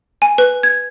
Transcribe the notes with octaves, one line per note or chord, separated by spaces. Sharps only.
G#5
B4
G#6